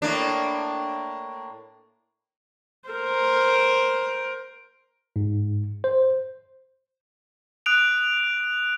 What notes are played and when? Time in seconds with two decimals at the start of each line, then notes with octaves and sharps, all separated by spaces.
0.02 A2 A#3 D4
2.89 A#4 C5
5.16 G#2
5.84 C5
7.66 D#6 F#6 D7 F7